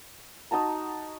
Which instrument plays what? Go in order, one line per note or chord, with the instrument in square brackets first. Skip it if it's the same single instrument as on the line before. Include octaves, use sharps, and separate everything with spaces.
[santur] D#4 F#4 A5 A#5